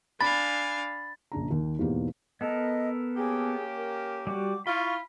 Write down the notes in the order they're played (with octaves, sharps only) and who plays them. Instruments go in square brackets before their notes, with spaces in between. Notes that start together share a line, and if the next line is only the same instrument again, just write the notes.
[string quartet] D4 F5 G#5 [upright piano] B5 [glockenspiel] A6
[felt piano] A#1 C#3 D4 A#5
D#2 D#3
E2 G#2 B2 A#3 G4
[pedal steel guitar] B3 A4 A#4 [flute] D#5
[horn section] A#3 C#4 G4 [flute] G#4
[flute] A#4
[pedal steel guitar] G3 F#4 [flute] D6
[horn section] E4 F4 [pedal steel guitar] B5 [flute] C#6